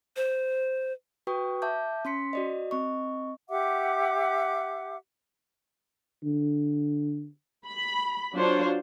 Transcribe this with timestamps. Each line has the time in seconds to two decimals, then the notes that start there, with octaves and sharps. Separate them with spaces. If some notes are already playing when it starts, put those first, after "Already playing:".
0.16 C5
1.27 F#4 B4 G5 C#6 D#6
1.62 E5 A5 D6 G6
2.05 C#4 C6 B6 C#7
2.33 F#4 D5 D#5
2.71 C4 D#5 C#6
3.49 G4 E5 F#5 D6
6.24 D3
7.67 B5
8.34 F#3 D4 F4 C5 C#5